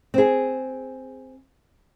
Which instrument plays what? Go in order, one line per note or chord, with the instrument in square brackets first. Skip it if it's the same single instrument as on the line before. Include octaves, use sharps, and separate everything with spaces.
[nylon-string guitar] C4 G#4